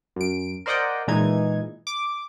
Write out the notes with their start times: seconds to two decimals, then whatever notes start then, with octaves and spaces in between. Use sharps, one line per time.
0.16 F#2 D7
0.66 A#4 C5 D5 D#5 F#5 G5
1.07 A#2 E3 G#3 D#4 G#6
1.87 D6